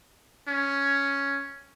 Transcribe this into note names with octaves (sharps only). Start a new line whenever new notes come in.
C#4